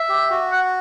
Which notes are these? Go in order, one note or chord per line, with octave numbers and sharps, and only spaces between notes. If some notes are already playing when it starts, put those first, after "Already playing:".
Already playing: E5
G4
F#4
F#5